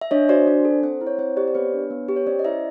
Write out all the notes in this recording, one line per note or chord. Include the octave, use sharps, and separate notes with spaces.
E5
D4 C#5 D#5
F#4 C5 D5
D4
A4
C4 C5
E4
C#5
C4 C5
G4 C5 D5
D5
B3 B4 C#5
D4
B3
G4
C#5
C#4 C5 D5
D#5
E4 D5 E5